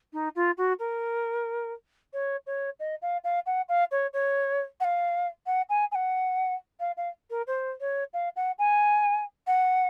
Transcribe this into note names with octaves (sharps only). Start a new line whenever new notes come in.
D#4
F4
F#4
A#4
C#5
C#5
D#5
F5
F5
F#5
F5
C#5
C#5
F#5
F5
F#5
G#5
G#5
F#5
F5
F5
A#4
C5
C#5
F5
F#5
G#5
F#5